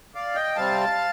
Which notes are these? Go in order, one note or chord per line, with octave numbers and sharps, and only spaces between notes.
D5 F5
D#5 G5
C3 G3 C4 F5 A5